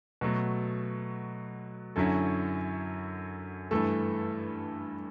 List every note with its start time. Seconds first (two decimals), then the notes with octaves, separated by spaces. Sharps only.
0.21 B2 F#3 A3
1.96 F#2 D3 F#3 C#4 E4 A4
3.71 G2 E3 A3 A4